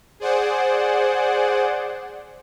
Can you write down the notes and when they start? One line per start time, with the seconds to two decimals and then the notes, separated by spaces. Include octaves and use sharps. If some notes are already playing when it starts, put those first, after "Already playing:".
0.20 G#4 C5 D5 F#5